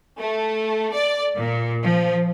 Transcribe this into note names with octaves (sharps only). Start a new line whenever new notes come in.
A3
D5
A#2
F3